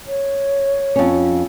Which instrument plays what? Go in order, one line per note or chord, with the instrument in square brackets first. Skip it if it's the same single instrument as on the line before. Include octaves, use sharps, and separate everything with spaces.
[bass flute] C#5
[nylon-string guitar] F2 C#4